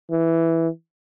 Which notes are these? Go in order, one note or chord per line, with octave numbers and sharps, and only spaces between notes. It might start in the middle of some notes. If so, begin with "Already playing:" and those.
E3